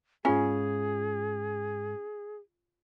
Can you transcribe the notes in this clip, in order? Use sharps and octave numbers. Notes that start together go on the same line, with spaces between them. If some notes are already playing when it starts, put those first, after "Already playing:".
G#2 C#4 F4 G#4 F5 G#5